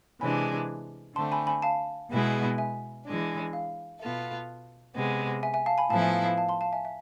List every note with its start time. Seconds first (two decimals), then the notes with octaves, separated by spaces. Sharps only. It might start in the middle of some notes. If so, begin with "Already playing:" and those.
0.21 C3 E3 G#3 D4 G#5 B5
1.16 D3 A3 C4 A5 C6
1.32 G#5 B5
1.47 G#5 B5
1.62 F5 A5
2.11 B2 G#3 B3 E4 G#4
2.58 E5 G#5
3.05 E3 G#3 D4
3.53 F5
4.00 B2 B3 F4 A4 E5
4.95 C3 G#3 B3
5.43 E5 G#5
5.54 E5 G#5
5.66 F5 A5
5.78 G#5 B5
5.89 A2 F3 B3 E4 A4 F5 A5
6.02 E5 G#5
6.13 F5
6.26 F5
6.37 F5 A5
6.49 A5 C6
6.61 F5 A5
6.73 E5 G#5
6.85 E5